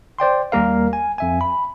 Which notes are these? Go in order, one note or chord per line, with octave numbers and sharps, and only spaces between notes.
C5 D5 G5 C6
D#2 G3 A#3 A#4 F5
G#5
F2 E5 G#5
B5